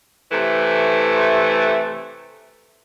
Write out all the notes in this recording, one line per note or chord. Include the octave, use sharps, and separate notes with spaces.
C3 E3 A3